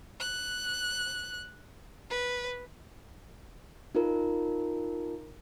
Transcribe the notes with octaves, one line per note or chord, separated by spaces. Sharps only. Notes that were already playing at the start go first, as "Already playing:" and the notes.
F#6
B4
D#4 F4 A#4